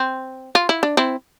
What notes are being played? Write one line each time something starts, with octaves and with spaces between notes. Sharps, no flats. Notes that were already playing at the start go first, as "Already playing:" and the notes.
Already playing: C4
F4
E4
D4
C4 E4